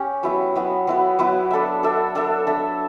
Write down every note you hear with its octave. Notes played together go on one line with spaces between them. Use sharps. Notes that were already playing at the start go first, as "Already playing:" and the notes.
Already playing: C#4 G4
F#3 B3 E4 B4
F#3 B3 E4 B4
F#3 B3 E4 B4
F#3 B3 E4 B4
D4 A4 E5
D4 A4 E5
D4 A4 E5
D4 A4 E5